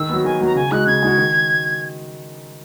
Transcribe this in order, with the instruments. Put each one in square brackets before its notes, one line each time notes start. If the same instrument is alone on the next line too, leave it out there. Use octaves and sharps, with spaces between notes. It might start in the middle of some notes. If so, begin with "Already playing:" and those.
Already playing: [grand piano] D#3 [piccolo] E6
[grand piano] F#3 B3
[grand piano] D#3 [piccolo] G#5
[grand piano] F#3 B3 [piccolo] A#5
[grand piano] C#3 [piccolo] G#5
[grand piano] G#3 D#4 F#4 [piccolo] F#6
[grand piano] C#3 [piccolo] G#6
[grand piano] G#3 D#4 F#4
D#3